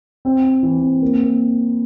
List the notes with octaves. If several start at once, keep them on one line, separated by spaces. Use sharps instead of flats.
C4
C4
E3
C4
A#3
A#3